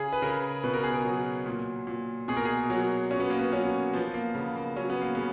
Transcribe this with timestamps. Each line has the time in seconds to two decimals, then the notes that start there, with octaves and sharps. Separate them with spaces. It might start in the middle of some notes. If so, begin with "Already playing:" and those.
Already playing: C#3 G#4
0.13 B4
0.22 C#3 A#4
0.64 B2 B4
0.74 A#4
0.83 G#4
0.94 A#4
1.05 F#3
1.46 A#2
1.87 A#2
2.28 B2 G#4
2.37 A#4
2.45 G#4
2.70 F#3
3.11 F#3 C#4
3.20 B3
3.30 A#3
3.39 B3
3.53 F#3 C#4
3.93 F3 B3
4.14 A#3
4.35 C#3 B3
4.56 A#3
4.76 F#3 C#4
4.90 B3
5.02 A#3
5.15 C#3 B3